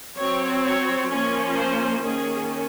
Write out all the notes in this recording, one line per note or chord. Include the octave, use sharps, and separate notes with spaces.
F#3 C4 C#5
C#5
F3 A#3 C#4 C#5
C5
D#3 A#3 C#4 G#4